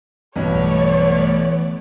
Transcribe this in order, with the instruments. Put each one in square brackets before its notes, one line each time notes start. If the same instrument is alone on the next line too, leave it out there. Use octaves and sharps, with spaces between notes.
[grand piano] B1 G2 B2 [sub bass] E3 [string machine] A3 B3 D5 [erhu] C#5